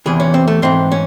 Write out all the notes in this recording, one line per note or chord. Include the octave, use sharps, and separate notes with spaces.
E2 C3 E3 G#4
C#4
C4
A3
G#2 E3 C4
C#4